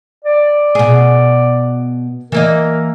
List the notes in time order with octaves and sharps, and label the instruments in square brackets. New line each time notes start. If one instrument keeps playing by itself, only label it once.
[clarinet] D5
[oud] B2 G#4
[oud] E3 A#3 D#5 [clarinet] A#4